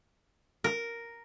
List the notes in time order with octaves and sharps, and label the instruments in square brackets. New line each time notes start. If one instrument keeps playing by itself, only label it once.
[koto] A#4